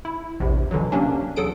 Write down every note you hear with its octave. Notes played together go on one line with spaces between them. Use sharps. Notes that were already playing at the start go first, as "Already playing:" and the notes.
E4
A#1 E2 C3
B2 D3 E3 F#3
C3 F#3 A#3 C#4 D4
E2 F#3 A4 D#6 D7